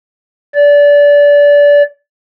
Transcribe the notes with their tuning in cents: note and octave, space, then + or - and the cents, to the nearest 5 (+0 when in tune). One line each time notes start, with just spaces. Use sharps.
D5 -25